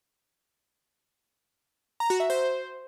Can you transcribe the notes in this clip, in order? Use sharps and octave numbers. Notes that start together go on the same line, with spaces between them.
A#5
F#4
E5
C5